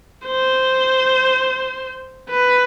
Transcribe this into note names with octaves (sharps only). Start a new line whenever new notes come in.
C5
B4